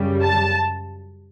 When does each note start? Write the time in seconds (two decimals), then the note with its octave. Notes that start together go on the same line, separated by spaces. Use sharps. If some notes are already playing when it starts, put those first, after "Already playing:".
Already playing: F#2 C#3 G3
0.23 A5